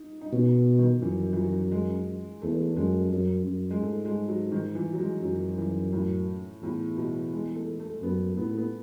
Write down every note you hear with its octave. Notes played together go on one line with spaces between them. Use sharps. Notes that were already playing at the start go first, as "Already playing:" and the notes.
Already playing: D#4
D#4
B2 C#4
D#3
F#2 E3
E3
F#3
G#3
E2 A3
F#2 G#3
F#2
F#2
G#3
G#2 A3
G#3
F#3
D#3
E3
F#3
G#3
F#2 F#3
E3
A2
E2 A2
B2
G#3
A3
A3
F#2 B3
A2 B3
A3
B3